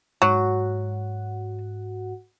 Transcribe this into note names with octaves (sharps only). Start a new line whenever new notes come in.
G#2 F#3 F#4 F#5